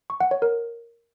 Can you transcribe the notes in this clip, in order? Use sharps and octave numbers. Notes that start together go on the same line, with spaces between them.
C#6
F#5
C#5
A#4